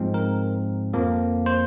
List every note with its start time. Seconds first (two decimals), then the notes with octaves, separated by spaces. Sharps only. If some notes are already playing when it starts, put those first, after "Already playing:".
Already playing: G#2 F3 G#3 C4
0.14 A#4
0.94 F2 F3 A#3
1.46 C5